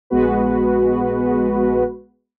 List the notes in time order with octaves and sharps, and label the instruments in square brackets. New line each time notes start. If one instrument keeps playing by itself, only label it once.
[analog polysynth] A#1 G#3 B3 F#4 B4